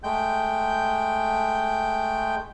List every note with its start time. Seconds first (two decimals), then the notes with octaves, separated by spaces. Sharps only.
0.04 G#3 A3 G5 G6